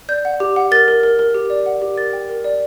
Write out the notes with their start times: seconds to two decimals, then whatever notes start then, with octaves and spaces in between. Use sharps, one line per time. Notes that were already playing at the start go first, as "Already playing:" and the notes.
0.09 D5 G6
0.25 F#5
0.40 G4
0.56 F#5
0.71 A#4 A6
0.88 A#4
1.03 A#4
1.19 A#4
1.34 G4
1.50 D5
1.66 F#5
1.82 G4
1.98 A#4 A6
2.13 G5
2.29 A#4
2.44 D5